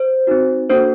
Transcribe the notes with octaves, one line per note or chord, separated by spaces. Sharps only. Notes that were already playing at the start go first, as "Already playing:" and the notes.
Already playing: C5
C4 D#4 F#4
A#3 D4 F#4 A4 C5